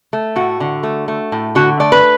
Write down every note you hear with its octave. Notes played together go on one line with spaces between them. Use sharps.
A3
A2 F#4
D3
A3
A3
A2
D3 F#4
A3 D5
B4